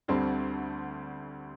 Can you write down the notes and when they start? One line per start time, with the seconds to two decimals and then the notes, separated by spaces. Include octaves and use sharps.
0.08 D2 D3 G3 C4